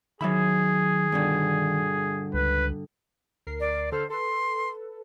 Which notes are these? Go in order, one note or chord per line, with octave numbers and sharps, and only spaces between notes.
D#3 F#3 G#4 E5 B5
G2 B2 D3
C#2 B4
D2 A#4 C7
D5
D3 A4 C5 F6
A4 B4 C6